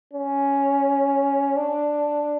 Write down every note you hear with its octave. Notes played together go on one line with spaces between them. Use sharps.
C#4
D4